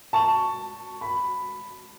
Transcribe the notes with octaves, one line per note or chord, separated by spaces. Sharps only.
A5 C#6
B5